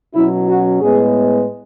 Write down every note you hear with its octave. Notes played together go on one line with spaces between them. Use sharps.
B2 F#3 C#4 E4
F#4
A2 G#3 B3 G#4